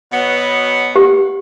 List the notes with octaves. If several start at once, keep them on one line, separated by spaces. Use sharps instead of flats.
B2 F#3 B3
G4